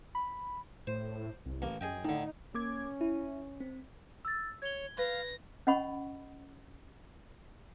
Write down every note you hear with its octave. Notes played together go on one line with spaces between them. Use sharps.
B5
A2 C5
C2
A1 A#3
F#2 G#4 D#5 G5
A2 D3 D#4
A#3 C#4 D6 G#6
E4
C4
E6 A6
C#5 G#6 G7
B4 F5 A#6
C#4 D#5 F#5 B5 C#6